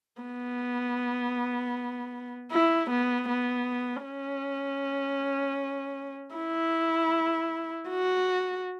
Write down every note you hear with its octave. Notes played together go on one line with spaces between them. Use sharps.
B3
E4
B3
B3
C#4
E4
F#4